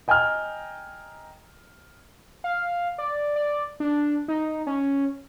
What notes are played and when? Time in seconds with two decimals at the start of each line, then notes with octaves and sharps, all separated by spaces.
0.08 D#5 G5 G#5 A#5 F6
2.44 F5
2.98 D5
3.36 D5
3.80 D4
4.28 D#4
4.67 C#4